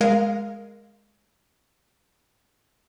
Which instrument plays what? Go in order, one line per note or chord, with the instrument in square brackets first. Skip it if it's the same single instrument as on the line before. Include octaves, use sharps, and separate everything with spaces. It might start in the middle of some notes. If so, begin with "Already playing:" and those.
[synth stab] G#3 A#4 F5